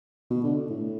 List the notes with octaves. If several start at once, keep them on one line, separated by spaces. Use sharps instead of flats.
B2
D3
A2